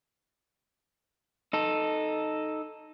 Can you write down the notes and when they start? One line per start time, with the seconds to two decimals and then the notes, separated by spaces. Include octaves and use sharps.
1.53 D#4 A4